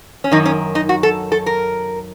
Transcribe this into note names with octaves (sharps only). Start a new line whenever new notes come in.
C#4
F#2 D#3 D#4
C#4
D#4
F#4
A4
A4
A#4